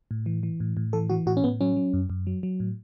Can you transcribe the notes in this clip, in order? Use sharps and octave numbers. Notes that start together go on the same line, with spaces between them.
A2
E3
E3
A2
A2
E3 A4
E3 F#4
A2 F#4
C#4
A2 B3
F#3 C#4
F#3
F#2
F#2
F#3
F#3
A2